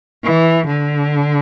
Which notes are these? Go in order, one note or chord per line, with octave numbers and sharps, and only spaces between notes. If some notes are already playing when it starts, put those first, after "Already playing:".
E3
D3